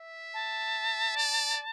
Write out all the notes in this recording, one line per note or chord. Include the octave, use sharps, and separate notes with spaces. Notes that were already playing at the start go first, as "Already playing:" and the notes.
Already playing: E5
A5
D5